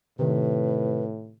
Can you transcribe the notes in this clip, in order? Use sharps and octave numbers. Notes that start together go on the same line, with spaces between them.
A2 C3 D#3 B4